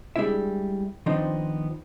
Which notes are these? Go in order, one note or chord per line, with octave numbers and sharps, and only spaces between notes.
G3 G#3 D4 E4 E5
D#3 F3 B3 C4 D4 D#4